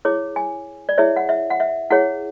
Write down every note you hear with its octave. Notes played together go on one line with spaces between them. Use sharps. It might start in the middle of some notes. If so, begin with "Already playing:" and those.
E4 G#4 C#5 D6
G#5
D5
E4 G#4 C#5 E5
F#5
E5
F#5
E5
E4 G#4 C#5 F#5